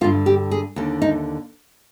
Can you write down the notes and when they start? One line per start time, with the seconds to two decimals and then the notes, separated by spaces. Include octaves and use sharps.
0.01 D3 F4
0.04 G2
0.26 G4
0.51 G#4
0.76 D#2 D3
1.02 D#4